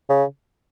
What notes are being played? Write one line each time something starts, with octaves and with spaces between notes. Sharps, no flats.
C#3